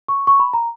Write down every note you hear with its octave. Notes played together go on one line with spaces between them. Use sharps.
C#6
C#6
B5
A#5